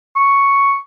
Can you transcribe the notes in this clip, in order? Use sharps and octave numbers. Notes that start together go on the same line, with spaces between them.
C#6